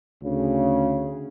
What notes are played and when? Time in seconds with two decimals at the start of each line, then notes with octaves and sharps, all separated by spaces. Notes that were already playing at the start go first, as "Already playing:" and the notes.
0.23 D2 C#3